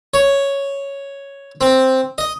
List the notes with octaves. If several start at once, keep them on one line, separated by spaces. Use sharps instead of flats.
C#5
C4
D#5